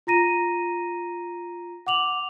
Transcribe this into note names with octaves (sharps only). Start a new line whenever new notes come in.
F4 A#5 A#6 D#7
F#5 D6 F7 F#7